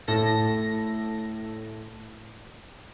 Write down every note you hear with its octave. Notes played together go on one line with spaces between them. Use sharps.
A2 A4 A#6